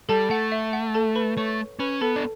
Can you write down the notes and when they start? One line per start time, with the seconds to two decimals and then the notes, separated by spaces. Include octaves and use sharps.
0.09 G3 A4 A5
0.30 A3 F#5
0.52 E5
0.73 F#5
0.94 A4 A5
1.15 B4 B5
1.37 A3 C#5 C#6
1.79 C#4 B4 B5
2.01 B3 A4 A5
2.16 D4